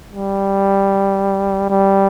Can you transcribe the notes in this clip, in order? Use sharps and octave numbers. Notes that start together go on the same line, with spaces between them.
G3
G3